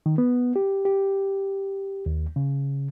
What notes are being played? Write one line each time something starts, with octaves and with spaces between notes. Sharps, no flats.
D#3
B3
G4
G4
D#2
C#3